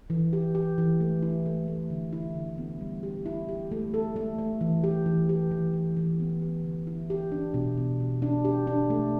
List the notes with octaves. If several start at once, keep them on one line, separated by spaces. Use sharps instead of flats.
E3
G4
G4
E3
A3
E4
A3
A3
D3
E4
D3
B3
G3
G4
E4
G4
A3
A4
A3
A3
E3
G4
E3
G4
E3
E3
E3
B3
G4
D3
E4
G4
D4
B2
B2
B2
D4
G4
D4
A3